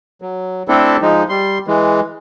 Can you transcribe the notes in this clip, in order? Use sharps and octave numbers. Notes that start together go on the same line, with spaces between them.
F#3
A3 C4 D4 E4 A4
F3 G#3 D#4
G3 C6
E3 G#3